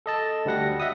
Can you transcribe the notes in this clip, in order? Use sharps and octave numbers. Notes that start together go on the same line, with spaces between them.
A4 D#5 A5
D2 G3 F#5 A#6
D#5 E5 F#5 D#6